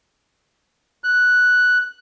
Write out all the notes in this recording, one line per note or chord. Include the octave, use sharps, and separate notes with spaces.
F#6